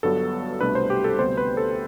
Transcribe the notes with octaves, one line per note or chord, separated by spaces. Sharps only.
G1 G2 F#3 B3 A4
C2 B2 A3 D4 B4
C5
G4
A4
D2 C3 G3 B3 C5
B4
A4